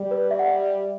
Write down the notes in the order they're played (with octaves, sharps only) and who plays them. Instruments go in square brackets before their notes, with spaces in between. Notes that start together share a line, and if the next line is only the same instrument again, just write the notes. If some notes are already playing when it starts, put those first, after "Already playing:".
Already playing: [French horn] G3
[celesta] B4
E5
F#5
E5